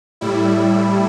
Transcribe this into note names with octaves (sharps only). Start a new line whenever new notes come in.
A2 G3 E4